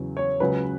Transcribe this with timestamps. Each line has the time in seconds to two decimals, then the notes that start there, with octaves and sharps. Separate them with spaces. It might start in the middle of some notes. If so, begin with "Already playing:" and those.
Already playing: E2 C#3 F#3
0.17 C#5
0.40 C#2 C#3 F#3 B4